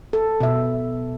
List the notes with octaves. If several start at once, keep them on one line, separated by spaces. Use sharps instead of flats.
A4
B2 E5